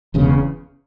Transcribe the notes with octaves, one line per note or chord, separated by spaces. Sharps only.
E1 E2 C#3